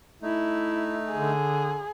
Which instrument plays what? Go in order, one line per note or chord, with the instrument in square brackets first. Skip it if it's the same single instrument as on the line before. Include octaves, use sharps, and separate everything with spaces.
[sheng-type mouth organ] A3 D#4 [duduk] E4
[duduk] D3 [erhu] G#4